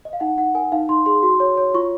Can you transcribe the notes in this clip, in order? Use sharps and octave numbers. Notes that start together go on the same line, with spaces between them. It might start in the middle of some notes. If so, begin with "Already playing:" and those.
D#5
F5
D#4 F#5
D#4 F#5
A#4 G#5
D#4 F5
D#4 C6
G#4 C6
F#4 C6
C#5
C#5
F4 C#6